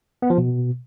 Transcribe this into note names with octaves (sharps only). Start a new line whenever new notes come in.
B3
F3
B2